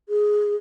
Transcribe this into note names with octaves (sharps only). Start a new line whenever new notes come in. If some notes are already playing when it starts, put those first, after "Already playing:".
G#4